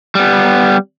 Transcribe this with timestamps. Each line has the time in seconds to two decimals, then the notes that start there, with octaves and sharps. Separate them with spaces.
0.15 G3 B3